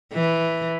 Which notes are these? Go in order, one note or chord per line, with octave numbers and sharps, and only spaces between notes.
E3